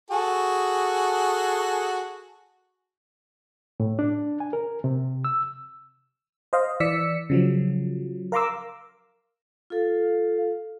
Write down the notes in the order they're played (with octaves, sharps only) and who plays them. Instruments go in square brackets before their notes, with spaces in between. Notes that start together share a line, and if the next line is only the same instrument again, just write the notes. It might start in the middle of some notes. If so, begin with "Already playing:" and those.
[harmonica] F#4 G#4 A4
[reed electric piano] A2
D4
G#5
A#4
C3
E6
[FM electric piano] C5 D#5 F5
E3 D5 E6 B6 C#7
C#3 F3 F#3
A#4 F5 A#5 C6 D6 E6
[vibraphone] F4 A4 [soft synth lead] F5